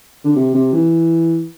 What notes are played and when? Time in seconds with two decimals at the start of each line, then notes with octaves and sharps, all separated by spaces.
0.24 D3
0.36 C3
0.54 C3
0.73 E3